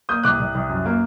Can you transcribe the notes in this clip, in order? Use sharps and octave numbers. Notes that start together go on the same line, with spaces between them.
A#3 D#6 G6
C2 D6 F#6
C2
C2
F#2
A#3